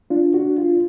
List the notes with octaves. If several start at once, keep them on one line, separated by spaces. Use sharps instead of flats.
D4 F4
F#4
D4
F4